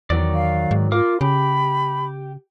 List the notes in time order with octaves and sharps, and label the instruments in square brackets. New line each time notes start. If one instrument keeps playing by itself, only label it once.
[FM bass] E2 [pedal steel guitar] D#3 F#3 D5
[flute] F5
[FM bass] G#2
[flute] F4 [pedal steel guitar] A#4 F5 D6
[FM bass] C#3 [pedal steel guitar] G4 [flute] B5